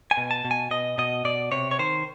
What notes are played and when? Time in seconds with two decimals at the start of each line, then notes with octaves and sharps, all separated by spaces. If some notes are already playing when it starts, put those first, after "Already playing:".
0.11 G#5
0.17 B2
0.31 A5
0.45 B2
0.51 G#5
0.71 B2 D#5
0.98 B2 D#5
1.25 B2 D5
1.52 C3 C#5
1.71 C#5
1.79 D#3 C5